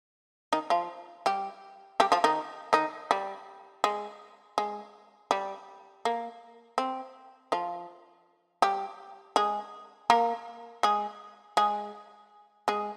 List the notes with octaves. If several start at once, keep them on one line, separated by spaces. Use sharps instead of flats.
D#3 D#4
F3 F4
G3 G4
G3 G4
F3 F4
D#3 D#4
D#3 D#4
G3
G#3
G#3
G3
A#3
C4
F3 F4
G3 G4
G#3 G#4
A#3 A#4
G#3 G#4
G#3 G#4
G#3 G#4